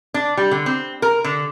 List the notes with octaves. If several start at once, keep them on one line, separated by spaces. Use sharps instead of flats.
D4
G3
D3
C4
A#4
D3